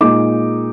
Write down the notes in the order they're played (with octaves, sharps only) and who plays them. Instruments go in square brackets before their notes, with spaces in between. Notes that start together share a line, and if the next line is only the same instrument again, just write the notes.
[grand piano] A#2 G#3 D#4 D6